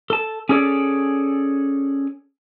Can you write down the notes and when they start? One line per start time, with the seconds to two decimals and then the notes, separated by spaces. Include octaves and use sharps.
0.10 A4 A5
0.49 C#4 G#4 A4 C#5 D5